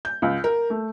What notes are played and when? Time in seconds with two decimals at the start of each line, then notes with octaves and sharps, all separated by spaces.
0.05 G6
0.22 C#2
0.44 A#4
0.70 A3